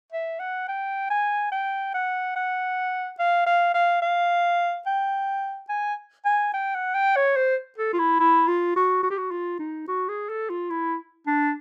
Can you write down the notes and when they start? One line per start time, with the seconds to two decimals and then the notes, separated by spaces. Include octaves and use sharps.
0.12 E5
0.39 F#5
0.68 G5
1.10 G#5
1.52 G5
1.94 F#5
2.36 F#5
3.19 F5
3.46 F5
3.74 F5
4.02 F5
4.86 G5
5.69 G#5
6.25 G#5
6.53 G5
6.74 F#5
6.94 G5
7.16 C#5
7.36 C5
7.78 A4
7.93 F4
7.99 E4
8.19 E4
8.48 F4
8.76 F#4
9.03 F#4
9.10 G4
9.18 F#4
9.31 F4
9.59 D#4
9.88 F#4
10.08 G#4
10.29 A4
10.49 F4
10.70 E4
11.26 D4